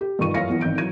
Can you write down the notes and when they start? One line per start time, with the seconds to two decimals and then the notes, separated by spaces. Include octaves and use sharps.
0.01 G4
0.19 G2 D#3 F4 C#6 D#7
0.34 F#2 E3 F4 F5 A#6 C#7
0.49 E3 B3
0.61 G#1 D#3 G6 D7
0.78 E3 F#3 G#6 D#7